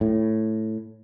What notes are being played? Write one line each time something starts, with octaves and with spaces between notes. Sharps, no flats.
A2